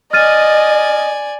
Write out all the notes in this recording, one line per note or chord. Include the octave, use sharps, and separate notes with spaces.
D5 D#5 G#5 F6 A6 D#7